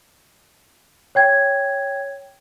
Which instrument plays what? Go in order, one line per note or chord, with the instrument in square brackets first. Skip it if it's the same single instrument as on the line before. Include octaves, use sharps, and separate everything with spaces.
[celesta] C#5 G5 G#6